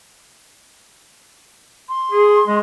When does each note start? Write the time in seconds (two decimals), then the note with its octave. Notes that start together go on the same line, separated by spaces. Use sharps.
1.89 C6
2.12 G#4
2.47 G#3